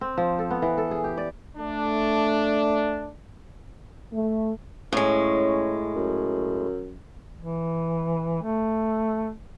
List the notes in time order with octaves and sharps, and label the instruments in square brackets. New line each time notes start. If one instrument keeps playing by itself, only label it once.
[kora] C4
F3
A4
B3
E3
A4
G#4
G4
D5
[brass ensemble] A3 D4
[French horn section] A3
[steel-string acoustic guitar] A2 G#3 [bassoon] C#4
[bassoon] F#2
[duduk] E3
A3